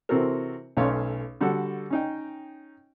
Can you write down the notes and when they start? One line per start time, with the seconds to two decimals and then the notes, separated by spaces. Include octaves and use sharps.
0.09 C3 E3 C4 F#4 A4 A#4
0.77 B1 A3 C#4 C#5 F5 C6
1.41 D3 G3 F#4 A4 F#5
1.90 C#4 D#4 G5